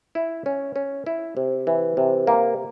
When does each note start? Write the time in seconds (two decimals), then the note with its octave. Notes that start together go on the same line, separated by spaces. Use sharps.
0.15 E4
0.46 C#4
0.76 C#4
1.06 E4
1.37 C3
1.67 E3
1.97 C3
2.27 A#3